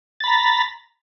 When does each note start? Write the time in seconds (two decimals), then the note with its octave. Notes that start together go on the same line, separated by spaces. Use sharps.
0.20 A6
0.24 B5
0.27 A#5